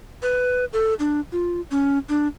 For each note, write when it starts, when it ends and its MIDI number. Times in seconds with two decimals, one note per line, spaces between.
0.22 0.65 71
0.73 0.94 69
1.00 1.20 62
1.32 1.60 65
1.71 1.98 61
2.09 2.27 62